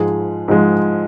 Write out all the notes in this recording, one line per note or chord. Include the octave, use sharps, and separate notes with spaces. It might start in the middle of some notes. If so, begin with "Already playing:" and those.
Already playing: G#2 F3 G#3 G#4
G#2 F3 G#3